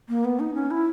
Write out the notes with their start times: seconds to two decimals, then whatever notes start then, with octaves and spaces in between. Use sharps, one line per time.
0.09 A#3
0.24 B3
0.40 D#4
0.54 C#4
0.71 E4